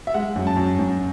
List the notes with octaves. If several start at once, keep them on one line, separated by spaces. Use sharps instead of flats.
E5
G#3 F#5
F#2
A5
F#2
F#2